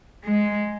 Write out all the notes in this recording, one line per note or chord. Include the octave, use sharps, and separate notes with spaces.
G#3